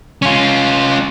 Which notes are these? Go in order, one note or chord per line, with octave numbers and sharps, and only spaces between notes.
C#4 F4